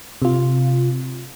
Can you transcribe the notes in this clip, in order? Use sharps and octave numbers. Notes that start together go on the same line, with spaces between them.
C3 F4